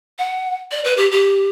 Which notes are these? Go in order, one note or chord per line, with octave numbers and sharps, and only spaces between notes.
F#5
D5
B4
G4
G4